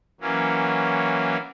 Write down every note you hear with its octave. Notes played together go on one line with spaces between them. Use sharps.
E3 F#3 A#3 C#4